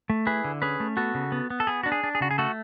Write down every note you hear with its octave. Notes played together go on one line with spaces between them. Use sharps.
A3
E4 G#4 B4
D3
C#4 G#4 B4
A3
B3 F#4 A4
C#3
B3
B3
A4
B3 G#4
D4 F#4
G#4
D4
G#4
C#3 F#4
G#4
A3 F#4 A4